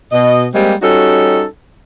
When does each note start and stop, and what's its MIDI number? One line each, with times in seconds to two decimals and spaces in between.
0.12 0.46 47
0.12 0.46 75
0.54 0.73 55
0.54 0.73 56
0.54 0.73 58
0.54 0.73 60
0.54 0.73 67
0.82 1.44 55
0.82 1.44 61
0.82 1.44 63
0.82 1.44 66
0.82 1.44 69